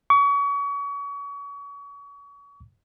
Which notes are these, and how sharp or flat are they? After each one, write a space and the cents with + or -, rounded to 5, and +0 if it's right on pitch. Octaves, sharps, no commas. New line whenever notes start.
C#6 +35